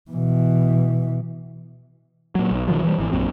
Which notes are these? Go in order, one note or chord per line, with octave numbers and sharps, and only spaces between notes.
B2 E3
A#2 F#3
B1
B2 D#3 F3 F#3
E3 G3
G#1 E3
A#1 F#2 C4